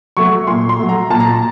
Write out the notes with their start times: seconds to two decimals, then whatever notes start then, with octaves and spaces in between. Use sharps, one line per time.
0.17 F#3 A3 C#6
0.47 A#2 C6
0.69 C6
0.79 F#3 A3
0.89 A#5
1.10 A#2 A5
1.20 A#5
1.30 A5